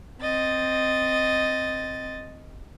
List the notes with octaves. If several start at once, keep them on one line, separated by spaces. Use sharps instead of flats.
C4 D#5 A6